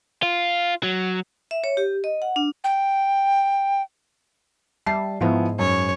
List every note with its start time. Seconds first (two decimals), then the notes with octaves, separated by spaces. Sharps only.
0.23 F4
0.83 F#3
1.51 E5
1.64 C#5
1.77 G4
2.04 D#5
2.22 F#5
2.36 D4
2.64 G5
4.87 G3 E5 A5 C7
5.21 G#2 F3 B3 E4
5.59 F#2 C#5